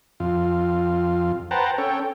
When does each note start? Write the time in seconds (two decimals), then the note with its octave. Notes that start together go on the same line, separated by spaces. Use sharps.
0.20 F2 F4
1.51 B4 C5 F#5 G5 A5 A#5
1.78 C#4 A4 C#5 G5